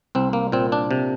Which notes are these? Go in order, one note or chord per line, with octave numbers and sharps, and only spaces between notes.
C2 C4
A#3
A#2 C4
D4
C3